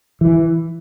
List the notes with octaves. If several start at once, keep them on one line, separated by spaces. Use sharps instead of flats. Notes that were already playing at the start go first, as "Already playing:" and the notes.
E3